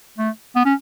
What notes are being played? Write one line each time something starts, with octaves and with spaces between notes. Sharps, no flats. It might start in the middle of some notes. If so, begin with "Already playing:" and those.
A3
B3
C#4